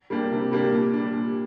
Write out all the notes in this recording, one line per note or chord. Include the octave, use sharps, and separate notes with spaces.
G3 A#3 D4 G4
C3
G3 A#3 D4 G4
A#2
G3 D4
A#2